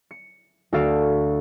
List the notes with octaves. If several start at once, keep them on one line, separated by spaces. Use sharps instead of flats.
C#7
D2 F#4 A4 F5 C#6 D7